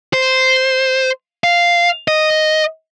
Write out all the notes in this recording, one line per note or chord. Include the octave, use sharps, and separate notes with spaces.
C5
F5
D#5